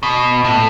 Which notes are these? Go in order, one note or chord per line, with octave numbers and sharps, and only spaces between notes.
B2
A2